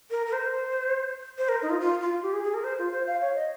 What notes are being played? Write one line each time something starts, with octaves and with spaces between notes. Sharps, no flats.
A#4
A#4
C5
C5
A#4
D#4
F4
F4
F4
G4
G#4
G#4
A#4
C5
F4
C5
F5
C#5
D#5